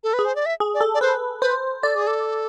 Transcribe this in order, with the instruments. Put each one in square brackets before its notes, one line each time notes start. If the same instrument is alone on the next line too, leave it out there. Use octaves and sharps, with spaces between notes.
[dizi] A4
B4
[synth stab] G#4
[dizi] C5
D5
E5
[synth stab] G#4
[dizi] D5
[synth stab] A4
[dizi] D5
[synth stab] B4 [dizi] C5
[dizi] B4 [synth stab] C5
[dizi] A4 [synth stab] D5
[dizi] G#4
A4